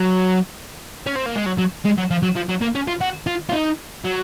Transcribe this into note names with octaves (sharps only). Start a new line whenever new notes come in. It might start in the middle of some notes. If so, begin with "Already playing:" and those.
Already playing: F#3
C#4
C4
A#3
G#3
F#3
F#3
G#3
F#3
F3
F#3
F3
F#3
A#3
C#4
F4
F#4
F4
F4
D#4
F#3